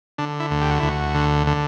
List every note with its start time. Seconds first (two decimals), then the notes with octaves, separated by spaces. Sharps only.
0.18 D3 D4
0.40 E4
0.51 D2
0.61 G4
0.71 F#4
0.80 D2 E4
0.88 F#4
1.15 D3
1.47 D3